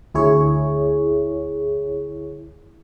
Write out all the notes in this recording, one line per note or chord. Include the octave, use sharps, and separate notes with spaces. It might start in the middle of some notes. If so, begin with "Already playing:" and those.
D2 E4 G#4 C#5